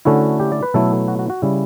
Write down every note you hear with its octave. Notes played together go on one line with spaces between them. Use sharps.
D3 A3 C#4 E4 F#4
G4
D5
B4
B2 F#3 A3 E4 A4
F#4
F#4
F#4
C#3 G3 C#4 E4